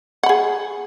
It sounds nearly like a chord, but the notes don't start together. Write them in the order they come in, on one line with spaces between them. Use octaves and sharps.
F#5 B5 G#4